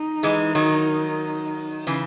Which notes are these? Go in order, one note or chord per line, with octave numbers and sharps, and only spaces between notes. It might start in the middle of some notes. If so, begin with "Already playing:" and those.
Already playing: D#4
E3 G#3
D#3 F#3
C#3 E3